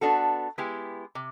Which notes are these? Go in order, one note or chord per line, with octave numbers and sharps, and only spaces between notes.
B3 D4 F#4 A4
G#3 B3 E4 G4
C3